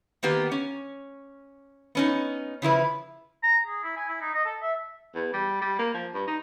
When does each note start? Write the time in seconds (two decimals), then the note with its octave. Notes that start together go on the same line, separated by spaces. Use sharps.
0.23 D#3 A#3 B3 G4
0.52 C#4
1.95 B3 C#4 D#4
2.62 C#3 F3 E4 B4
3.43 A#5
3.66 G#4
3.83 E4
3.96 G#5
4.08 E4
4.21 D#4
4.34 D#5
4.45 A4
4.62 E5
5.15 E2
5.33 G3
5.61 G3
5.79 A#3
5.94 F3
6.14 G2
6.27 D#4